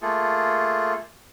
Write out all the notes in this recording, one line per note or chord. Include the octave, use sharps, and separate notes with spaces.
A3 A#3 F4 G#4 A4